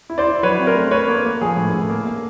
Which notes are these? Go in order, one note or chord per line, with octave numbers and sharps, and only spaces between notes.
E4
C5 D5
E4
F#3 B4 C#5
C4
A#4 C5
A3
D4 B4 C#5
A#3
A#3
F3 G#4
A2
A2
A#3
A#3